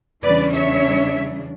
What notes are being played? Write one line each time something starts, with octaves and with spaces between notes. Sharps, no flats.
E2 C#3 E3 G3 D4 B4 D5
C#5 E5